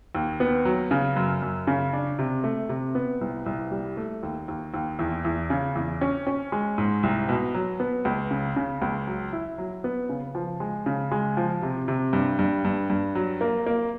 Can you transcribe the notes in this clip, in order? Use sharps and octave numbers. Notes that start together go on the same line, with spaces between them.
D#2
B3
F#3
C#3
F#2
F#2
C#3
D4
C3
A3
C3
B3
C2
C2
G3
A3
D#2
D#2
D#2
E2
E2
C#3
E2
C#4
C#4
G#3
G#2
C2
B2
F#3
B3
C#2
C#3
C#3
C#2
F#3
E4
F#3
B3
C#3
F3
G#3
C#3
G#3
F3
C3
C3
G2
G2
G2
G2
F#3
A#3
A#3